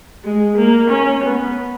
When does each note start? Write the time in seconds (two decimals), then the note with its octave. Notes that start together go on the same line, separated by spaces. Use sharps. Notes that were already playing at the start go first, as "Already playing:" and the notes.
0.24 G#3
0.57 A#3
0.90 C#4
1.23 B3